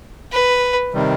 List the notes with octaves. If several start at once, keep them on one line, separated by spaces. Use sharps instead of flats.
B4
C3 D#3 G3